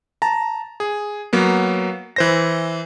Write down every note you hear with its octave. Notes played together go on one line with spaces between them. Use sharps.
A5 A#5
G#4
F#3 A#3 B3
E3 C5 A#6